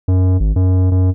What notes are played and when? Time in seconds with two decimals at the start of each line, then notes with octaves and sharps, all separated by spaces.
0.08 F#2
0.40 G#1
0.56 F#2
0.91 F#2